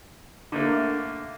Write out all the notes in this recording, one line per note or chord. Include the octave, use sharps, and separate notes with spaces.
D3 A3 A#3